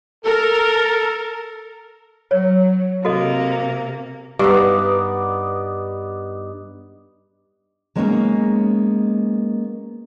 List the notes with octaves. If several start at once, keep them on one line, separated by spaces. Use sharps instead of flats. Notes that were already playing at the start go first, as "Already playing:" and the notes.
A4 A#4
F#3 C#5
C3 A#3 F#4 A4 D#5
G2 B3 D#4 D5
F#3 G#3 A#3 B3 C#4 D#4